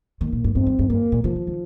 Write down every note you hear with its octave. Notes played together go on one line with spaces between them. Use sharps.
D#3 A#3
A#2
G2
G2 C4
G2
G2
G2 A#3
A#2
C3 F3
D#3
D#3